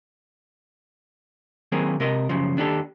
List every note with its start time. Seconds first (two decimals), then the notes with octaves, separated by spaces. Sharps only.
1.72 D#3 F#3 A#3 C4 G#4
2.00 C3 A#4 D#5
2.29 F#2 C#3 F3
2.57 D#2 D4 G4 A4